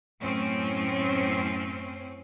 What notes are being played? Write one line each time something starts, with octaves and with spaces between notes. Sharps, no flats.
F#2 A2 C4 C#4